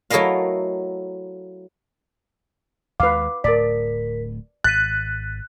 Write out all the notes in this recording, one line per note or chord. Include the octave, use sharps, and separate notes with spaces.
F#3 A3 E4 A#4 D#5 F5
D#2 G#3 B4 F5 D6
D1 A2 A#4 D5 B6
G#1 F#6 A6 B6 D#7